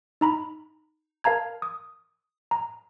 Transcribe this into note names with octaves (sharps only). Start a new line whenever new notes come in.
D#4 A#5 B5
A#4 F5 A5 A#5 G#6
D#6
A#5